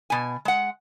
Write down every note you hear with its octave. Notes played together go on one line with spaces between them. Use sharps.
B2 G#5
G#3 F#5